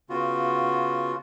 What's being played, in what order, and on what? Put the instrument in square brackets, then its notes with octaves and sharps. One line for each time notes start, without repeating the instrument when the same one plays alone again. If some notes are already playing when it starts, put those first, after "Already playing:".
[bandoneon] C#3 B3 F4 F#4